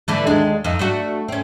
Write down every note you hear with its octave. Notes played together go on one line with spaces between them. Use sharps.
D3 E3 A3
D#2 G#3 D4
F2 D#4
A3 D4 F#4
C4 C#4